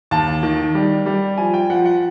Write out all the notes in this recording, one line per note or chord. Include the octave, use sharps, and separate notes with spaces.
D#2 A5
D#3
G3
G3
F3 G#5
G5
F3 F#5
F#5